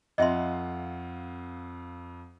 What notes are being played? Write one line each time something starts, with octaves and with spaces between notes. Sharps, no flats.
F2 F4 D#5 E5 F#5 C6